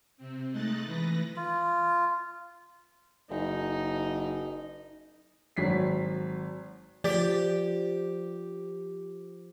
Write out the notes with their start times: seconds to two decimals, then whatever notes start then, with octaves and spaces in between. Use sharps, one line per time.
0.17 C3 C4
0.51 G#3 A3 D#4 D#5 F#6 A6
0.86 E3 B4 A#6
1.36 F4
3.30 F#1 D#4
5.57 G#1 F#3 B6 C7
7.04 F3 G4 D5